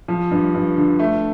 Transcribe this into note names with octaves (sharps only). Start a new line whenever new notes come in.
F3
G2
G2
D3
A3